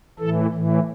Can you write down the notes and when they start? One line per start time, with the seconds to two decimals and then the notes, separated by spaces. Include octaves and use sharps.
0.19 A2 E3 A4
0.53 A2 E3